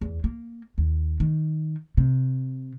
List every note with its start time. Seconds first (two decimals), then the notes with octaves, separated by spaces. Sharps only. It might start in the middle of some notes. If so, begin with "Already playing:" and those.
0.01 E2
0.24 A#3
0.78 D#2
1.20 D#3
1.97 C3